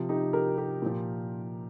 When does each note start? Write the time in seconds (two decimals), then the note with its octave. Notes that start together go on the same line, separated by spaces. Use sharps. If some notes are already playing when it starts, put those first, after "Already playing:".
Already playing: C3 F3
0.09 D#4 G4
0.33 G4 A#4
0.58 G4 A#4
0.82 A#2 F3